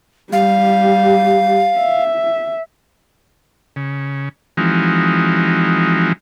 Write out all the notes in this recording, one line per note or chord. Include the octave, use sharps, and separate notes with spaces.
G3 G4 F5
E5
C#3
E3 F3 G#3 C4 D#4 F#4